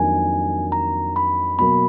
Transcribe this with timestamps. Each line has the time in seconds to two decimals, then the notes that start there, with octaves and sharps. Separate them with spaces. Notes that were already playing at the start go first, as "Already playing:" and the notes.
Already playing: F2 D#3 F#3 A#3 D4 G#5
0.72 A#5
1.16 B5
1.59 B2 F#3 A#3 B5